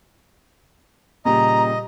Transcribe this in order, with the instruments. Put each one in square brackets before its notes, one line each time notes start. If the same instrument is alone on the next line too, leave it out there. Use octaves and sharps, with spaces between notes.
[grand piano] A#2 C#3 G3 [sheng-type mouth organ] D#5 [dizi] A#5